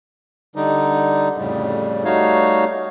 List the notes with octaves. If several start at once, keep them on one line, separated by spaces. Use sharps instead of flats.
D3 G3 D#4
F2 A2 C#3 G3
G3 A3 D#4 F#4 C#5 F5